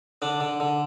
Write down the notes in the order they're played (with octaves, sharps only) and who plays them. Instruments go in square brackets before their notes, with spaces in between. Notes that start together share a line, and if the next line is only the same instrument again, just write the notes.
[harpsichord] D3 D4
D3
D3